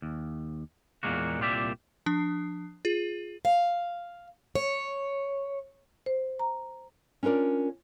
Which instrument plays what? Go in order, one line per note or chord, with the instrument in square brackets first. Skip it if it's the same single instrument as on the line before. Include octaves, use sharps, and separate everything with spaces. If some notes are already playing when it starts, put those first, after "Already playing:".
[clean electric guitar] D#2
E2 A#2 G#3 A#3 F#4
C2 A#2 F4 G4 D5 E5
[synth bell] F3 D4
F4 G#4
[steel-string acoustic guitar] F5
C#5
[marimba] C5
A#5
[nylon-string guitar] C#4 D4 F4 A#4 D5